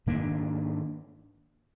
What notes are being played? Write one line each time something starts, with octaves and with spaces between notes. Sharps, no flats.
G#2 D#3 A#3 D4